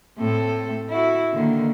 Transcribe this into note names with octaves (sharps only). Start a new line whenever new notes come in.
A2 C4 A4
E4 F#4
D3 D#3 A#3